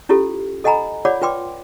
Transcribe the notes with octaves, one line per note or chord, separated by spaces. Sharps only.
C#4 E4 F4 G4 A4
A4 D#5 F#5 G#5 A#5 B5
F4 C#5 D5 F#5 B5 D6
F4 B4 G5 C6 D6